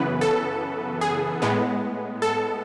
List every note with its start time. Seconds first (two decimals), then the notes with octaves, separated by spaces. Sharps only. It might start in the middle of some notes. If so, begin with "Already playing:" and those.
Already playing: F#2 C#3 E3 B3 B4
0.21 A4
1.01 G#4
1.42 A2 G#3 B3
2.22 A4